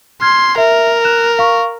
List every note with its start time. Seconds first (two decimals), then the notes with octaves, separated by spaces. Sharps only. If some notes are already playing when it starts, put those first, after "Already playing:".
0.21 C6 F6 G#6
0.57 A#4 E5
1.04 F#6 E7
1.39 F5 C#6